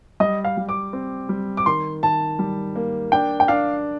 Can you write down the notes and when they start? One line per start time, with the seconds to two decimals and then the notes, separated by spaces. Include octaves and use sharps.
0.20 G3 D#5
0.44 F5
0.57 G3
0.69 D6
0.93 C4
1.29 G3
1.57 D6
1.66 D#3 C6
2.03 D#3 A5
2.39 G3
2.76 A#3
3.12 D4 G5
3.40 G5
3.48 D4 F5